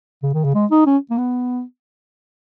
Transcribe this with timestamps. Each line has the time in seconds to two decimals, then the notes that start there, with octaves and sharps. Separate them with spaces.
0.23 C#3
0.33 D#3
0.44 C#3
0.54 G#3
0.71 D#4
0.86 C#4
1.10 A#3
1.18 B3